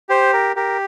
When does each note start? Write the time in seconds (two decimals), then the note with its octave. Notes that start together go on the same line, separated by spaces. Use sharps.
0.09 G4 C5
0.33 A#4
0.56 G4 A#4